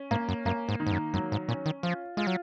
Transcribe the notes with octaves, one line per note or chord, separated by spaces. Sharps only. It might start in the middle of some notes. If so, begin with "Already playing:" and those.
Already playing: C#4
G#2 A#3
F#2
F#2 A#3
G#2
D#3
G#2
F#2
F#2 F#3
G#2
A#2 C#4
D#3
F3 F4
G#3 F4
F#3